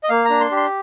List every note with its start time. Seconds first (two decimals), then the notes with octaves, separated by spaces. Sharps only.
0.04 D#5
0.09 A#3 F5
0.25 D4 A#5
0.40 C6
0.51 G4
0.56 C6